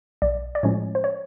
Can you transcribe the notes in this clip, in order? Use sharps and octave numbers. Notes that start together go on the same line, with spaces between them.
B1 D5
D5
A2 F3 G#3 C#4 C#5
C5
C#5